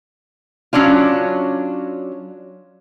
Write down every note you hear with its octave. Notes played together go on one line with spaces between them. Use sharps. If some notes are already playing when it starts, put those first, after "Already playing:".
F#3 C#4 D4 F4